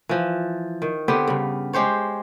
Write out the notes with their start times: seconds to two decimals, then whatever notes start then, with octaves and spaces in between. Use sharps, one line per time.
0.09 E3 F3
0.82 D#3
1.08 D3 B3 C4 G4
1.27 G2 C#3
1.73 G#3 G4 C5 C#5